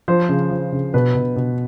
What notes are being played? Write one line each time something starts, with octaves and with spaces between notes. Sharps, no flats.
F3 C5
C#3
F3
C#3
B2 B4
B2
B2